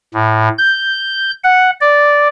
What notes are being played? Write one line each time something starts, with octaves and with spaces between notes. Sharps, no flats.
A2
G6
F#5
D5